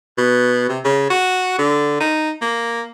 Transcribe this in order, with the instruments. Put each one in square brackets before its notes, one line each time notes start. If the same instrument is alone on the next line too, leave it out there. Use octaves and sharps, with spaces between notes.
[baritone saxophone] B2
C3
C#3
F#4
D3
D#4
A#3